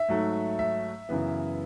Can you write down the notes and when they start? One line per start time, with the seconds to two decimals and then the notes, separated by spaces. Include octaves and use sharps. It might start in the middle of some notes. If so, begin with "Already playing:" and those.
Already playing: E5
0.09 G#2 F#3 A3
0.59 E5
1.09 F#2 C#3 E3 B3